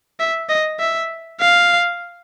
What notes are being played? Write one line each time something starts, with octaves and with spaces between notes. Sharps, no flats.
E5
D#5
E5
F5